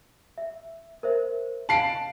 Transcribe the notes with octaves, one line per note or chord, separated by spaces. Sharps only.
E5
A#4 C5 E5
F5 A5 C7 D7 F#7